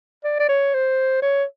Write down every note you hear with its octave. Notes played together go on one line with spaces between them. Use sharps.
D5
D5
C#5
C5
C#5